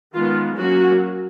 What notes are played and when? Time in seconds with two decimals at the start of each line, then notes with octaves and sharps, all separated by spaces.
0.15 D#3 G#3 B3 F4
0.58 F#3 A#3 C#4 F#4